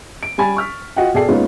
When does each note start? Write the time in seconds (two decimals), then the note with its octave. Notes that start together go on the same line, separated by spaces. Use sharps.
0.23 D7
0.38 G3 G4 G#5 B5 A6
0.56 C#6 F6 B6
0.96 F4 F#4 D#5 F#5 G5
1.14 B2 G#4 A4 D5 G5 C7
1.29 G#3 A#3 B3 C#4 D#4 F4